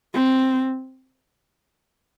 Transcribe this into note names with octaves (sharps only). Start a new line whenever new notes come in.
C4